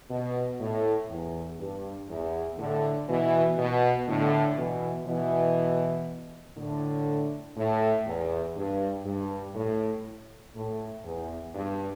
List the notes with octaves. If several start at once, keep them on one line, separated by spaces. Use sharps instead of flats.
B2
A2
E2
G2
E2
A2 D3
B2 E3
B2
A2 D3
B2 E3
B2 E3
A2 D3
A2
E2
G2
G2
A2
A2
E2
G2